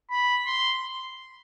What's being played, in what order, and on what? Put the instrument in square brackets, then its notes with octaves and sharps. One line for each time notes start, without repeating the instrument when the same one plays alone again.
[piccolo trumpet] B5
C6